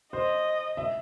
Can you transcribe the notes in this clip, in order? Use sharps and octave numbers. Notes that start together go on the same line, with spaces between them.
C5 D#5
E5